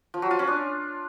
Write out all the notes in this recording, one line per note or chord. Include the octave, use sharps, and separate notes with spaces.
F3
F#3
F4
C#4
D4